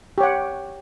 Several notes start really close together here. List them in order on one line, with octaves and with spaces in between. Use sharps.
G4 C#5 F#5